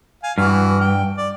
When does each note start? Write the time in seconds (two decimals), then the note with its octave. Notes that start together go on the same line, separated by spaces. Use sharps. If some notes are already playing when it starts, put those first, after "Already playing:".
0.23 F5 G#5
0.38 G2 E3 F#4 F6
0.81 G5
1.17 D5